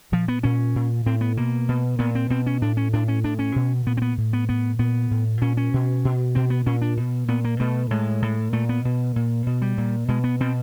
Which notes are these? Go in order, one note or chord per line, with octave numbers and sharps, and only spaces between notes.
A#2 F3
B3
A#2 C#4
A#2
A2 C4
B3
B2 A#3
B2
A#2 B3
C4
B2 C4
C#4
A2 D4
C#4
A2 D4
C#4
A2 D4
C#4
B2
A#2 B3
C4
B3
A2
B3
A2 B3
A#2 B3
A2
A#2 C#4
C#4
B2
B2
B2 C4
B3
A#2 C#4
D4
B2
A#2 B3
A#3
B2 A3
A2 G#3
A2
A#2 A3
B3
B2
A#2
B2
G3
A#2
B2 G#3
B3
B2 C4